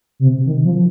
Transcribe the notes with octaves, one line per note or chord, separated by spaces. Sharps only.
C3
D#3
F3